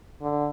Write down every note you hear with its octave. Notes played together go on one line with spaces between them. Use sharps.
D3